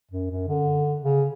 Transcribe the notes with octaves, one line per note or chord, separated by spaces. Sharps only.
F#2
F#2
D3
C#3